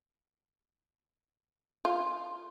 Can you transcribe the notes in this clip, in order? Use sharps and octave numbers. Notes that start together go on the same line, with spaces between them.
F4